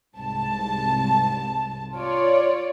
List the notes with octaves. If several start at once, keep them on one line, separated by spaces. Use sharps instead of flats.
C2 G#2 A5
F4 C#5 D5